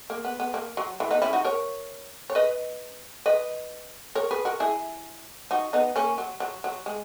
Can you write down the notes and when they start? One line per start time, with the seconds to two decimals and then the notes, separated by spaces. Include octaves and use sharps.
0.10 A#3
0.25 B3
0.40 B3
0.54 A#3
0.77 F#3
1.00 E3
1.11 B3 D#4
1.22 C#4 E4
1.33 D#4 F#4
1.44 A#4 C#5
2.30 C#5
2.35 B4 D#5
3.26 B4 D#5
4.15 A#4 C#5
4.31 G#4 B4
4.45 F#4 A#4
4.60 E4 G#4
5.51 D#4 F#4
5.73 B3 D#4
5.96 A#3 C#4
6.18 F#3
6.40 F#3
6.64 F#3
6.86 G#3